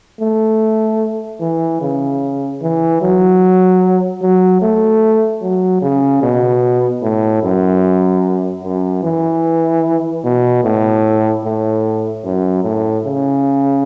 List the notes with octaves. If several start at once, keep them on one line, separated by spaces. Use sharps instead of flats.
A3
E3
C#3
E3
F#3
F#3
A3
F#3
C#3
B2
A2
F#2
F#2
E3
B2
A2
A2
F#2
A2
C#3